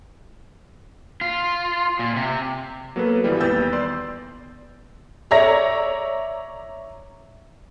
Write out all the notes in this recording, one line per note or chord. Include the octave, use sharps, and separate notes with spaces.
F4
A#2
C3
F#3 A#3 B3 A4 B4
G#1 E3 G3
D#2 B3 E6 G6 A6
D5 C6
C#5 D5 E5 A#5 A#6